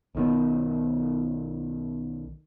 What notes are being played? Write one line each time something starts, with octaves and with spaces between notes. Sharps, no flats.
B1 D#3 B3